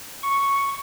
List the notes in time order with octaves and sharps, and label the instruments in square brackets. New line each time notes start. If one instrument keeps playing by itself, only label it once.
[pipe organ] C#6